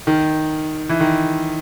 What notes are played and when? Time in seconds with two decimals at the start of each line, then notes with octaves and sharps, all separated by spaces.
0.07 D#3
0.89 E3
1.00 D#3